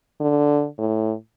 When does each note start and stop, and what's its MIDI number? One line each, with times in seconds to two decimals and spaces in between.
0.21 0.66 50
0.78 1.13 45